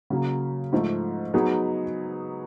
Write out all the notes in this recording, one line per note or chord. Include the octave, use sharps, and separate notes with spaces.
C#3 F#3 A#3
G#2 F3 A3
F#3 B3 D#4 G#4